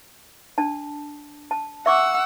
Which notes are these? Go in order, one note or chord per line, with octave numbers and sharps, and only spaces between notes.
D4 A5
A5
E5 F#5 C#6 D6 E6